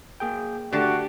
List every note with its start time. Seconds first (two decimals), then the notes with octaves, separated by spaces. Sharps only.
0.20 A#3 G#4 G5
0.73 D3 A3 D4 F#4 G4 A5